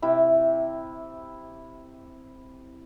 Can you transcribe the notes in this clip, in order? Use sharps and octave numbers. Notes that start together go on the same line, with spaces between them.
C3 E4